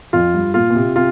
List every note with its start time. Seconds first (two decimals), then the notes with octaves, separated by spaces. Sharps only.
0.13 F2 F4
0.34 G2
0.54 A#2 F4
0.70 A#2
0.75 C3
0.96 C3 F4